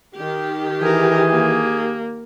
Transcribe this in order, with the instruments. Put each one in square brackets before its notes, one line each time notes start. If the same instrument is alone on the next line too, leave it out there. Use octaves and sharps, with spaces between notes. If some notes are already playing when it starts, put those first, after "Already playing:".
[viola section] D#3 G4
[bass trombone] E3 [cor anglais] G#4 [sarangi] A#4
[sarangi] A#3